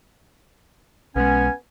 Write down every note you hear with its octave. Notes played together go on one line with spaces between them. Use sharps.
B1 G#3 B3 C#4 G#5